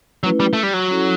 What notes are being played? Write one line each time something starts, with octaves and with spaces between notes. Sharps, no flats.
F#3 A3 C#4 E4 B4
G3
A3
G3
F#3
C#4 E4 A4